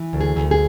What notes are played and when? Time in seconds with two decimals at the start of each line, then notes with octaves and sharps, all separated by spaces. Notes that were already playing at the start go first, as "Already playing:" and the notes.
Already playing: E3
0.13 D2
0.21 G#4
0.36 D2
0.51 G#4